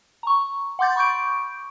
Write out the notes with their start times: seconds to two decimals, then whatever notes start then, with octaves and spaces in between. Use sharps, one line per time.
0.23 A#5 C#6
0.79 F#5 C6 D6 G6 A6
0.96 B5 C#6 D6 G6 D7